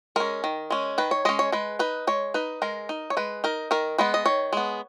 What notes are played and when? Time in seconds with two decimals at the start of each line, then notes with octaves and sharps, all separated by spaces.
0.16 G#3 C#4 A#4
0.44 D#3
0.70 G#3 C#4
0.98 D#3 B4
1.11 C#5
1.25 G#3 C#4 D#5
1.39 C#5
1.52 G#3 B4
1.79 D#4 B4
2.07 G#3 C#5
2.34 D#4 B4
2.62 G#3 A#4
2.89 D#4
3.10 C#5
3.17 G#3 B4
3.44 D#4 A#4
3.71 D#3 A#4
3.98 G#3 B3 B4
4.14 D#5
4.26 D#3 C#5
4.53 G#3 B3